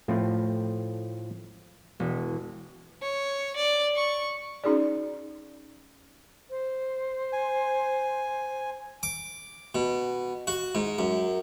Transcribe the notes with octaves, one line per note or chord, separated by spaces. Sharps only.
A2 F3 A3 C4
E1
C#5
D5
C#6
C#4 D#4 F#4 G#4 D5
C5
G#5
D6
B2
F#4
G#2
F#2